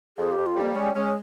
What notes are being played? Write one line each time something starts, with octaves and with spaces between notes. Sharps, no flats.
F2 G#4
G4
F2
F4
G3
A#3
G#3 C#4
G#3 C#4